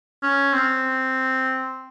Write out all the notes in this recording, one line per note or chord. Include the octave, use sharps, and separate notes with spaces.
C#4
C4